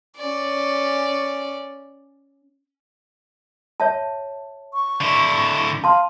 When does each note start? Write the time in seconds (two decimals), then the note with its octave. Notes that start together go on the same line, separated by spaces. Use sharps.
0.17 C#4 D5
3.80 C#5 E5 A5
4.73 C#6
5.01 D3 E4
5.84 F5 A5 C6